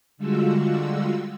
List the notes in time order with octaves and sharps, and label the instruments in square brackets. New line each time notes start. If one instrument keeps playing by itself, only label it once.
[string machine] D3 G3 G#3 F4 F#4 E6